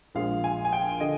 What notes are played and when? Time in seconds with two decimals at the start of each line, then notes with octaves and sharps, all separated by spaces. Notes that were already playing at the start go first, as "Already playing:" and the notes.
0.15 A#1 A#2 F3 G#3 F5
0.44 G#5
0.65 G#5
0.73 G5
1.00 D3 D#5